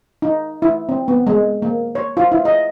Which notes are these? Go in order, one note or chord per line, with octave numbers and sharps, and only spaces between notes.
D#4
E4
C4
B3
G#3
A#3
C#5
F4
E4
D#5